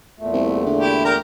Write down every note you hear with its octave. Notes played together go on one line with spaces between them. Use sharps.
E2 A#2 A3
C2
D3
E4 G4
G4 A#4 A#5